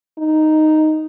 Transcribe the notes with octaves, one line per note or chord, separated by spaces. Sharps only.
D#4